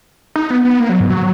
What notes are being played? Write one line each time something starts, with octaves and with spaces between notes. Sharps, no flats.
D#4
B3
B3
A#3
F#3
G#2
F#3